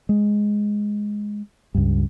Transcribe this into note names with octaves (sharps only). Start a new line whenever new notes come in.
G#3
C#2 G2